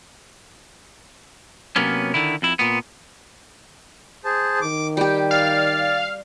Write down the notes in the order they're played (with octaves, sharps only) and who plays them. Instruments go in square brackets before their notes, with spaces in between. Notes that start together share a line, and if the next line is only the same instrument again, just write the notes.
[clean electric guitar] C3 F#3 A#3 B3 C#4
D3 D#3 E4
F2 E4
A#2 B3
[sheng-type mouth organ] G#4 C5 A5
[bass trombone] D#3 [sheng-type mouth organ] D6
[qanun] G3 G4 [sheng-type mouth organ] G5
[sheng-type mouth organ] D5 [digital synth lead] F5